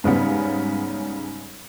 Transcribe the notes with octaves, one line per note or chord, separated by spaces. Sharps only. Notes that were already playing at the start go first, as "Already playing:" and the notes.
G#2 C#3 G3 B3